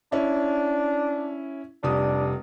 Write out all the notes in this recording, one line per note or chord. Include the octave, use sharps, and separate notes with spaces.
C#4 D4 E4
F1 G3 D4 D#6